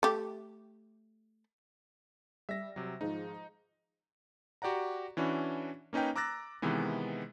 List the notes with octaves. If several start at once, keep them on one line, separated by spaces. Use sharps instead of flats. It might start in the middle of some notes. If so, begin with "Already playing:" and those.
A3 G4
G3 E5 A#6
C3 F#3
G#2 D#3 F3 D#4
F#4 G4 D5 F#5 A#5
E3 C#4 D4 E4 F#4
A#3 C#4 D#4 B4 G5
A#5 D6 E6 F#6 A6 A#6
C3 D#3 E3 G#3 B3